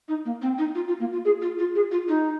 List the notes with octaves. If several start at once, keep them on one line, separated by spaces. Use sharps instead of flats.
D#4
A#3
C4
D#4
F4
F4
A#3
F4
G#4
F4
F4
G#4
F4
D#4